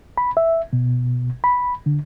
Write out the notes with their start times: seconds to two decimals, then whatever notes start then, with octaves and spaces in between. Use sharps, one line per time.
0.18 B5
0.37 E5
0.73 B2
1.44 B5
1.86 D3